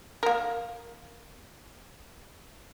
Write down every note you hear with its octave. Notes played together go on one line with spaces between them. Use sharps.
A#3 A#4